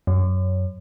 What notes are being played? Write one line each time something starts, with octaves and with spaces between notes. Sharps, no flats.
F#2